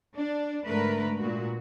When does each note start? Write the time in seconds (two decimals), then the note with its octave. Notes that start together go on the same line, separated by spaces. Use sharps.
0.16 D4
0.66 G#2 D3 A3 A#4 B4
1.19 A#2 F#4